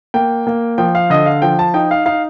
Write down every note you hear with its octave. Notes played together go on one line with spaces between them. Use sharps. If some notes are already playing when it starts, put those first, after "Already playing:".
A#3 G5
A#3
F3 G5
F5
D3 D#5
F5
F3 G5
A5
D#4 G5
F5
D#4 F5